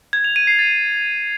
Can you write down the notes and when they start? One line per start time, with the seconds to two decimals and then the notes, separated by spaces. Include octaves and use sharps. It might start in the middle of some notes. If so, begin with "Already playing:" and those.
0.13 G#6
0.24 F7
0.36 D#7
0.47 C7
0.59 A6